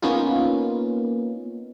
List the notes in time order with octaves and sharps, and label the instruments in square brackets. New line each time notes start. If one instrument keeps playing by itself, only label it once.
[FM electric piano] A#3 B3 C#4 D#4 F4